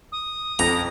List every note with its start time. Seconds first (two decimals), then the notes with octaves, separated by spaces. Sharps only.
0.12 D#6
0.59 F2 A#5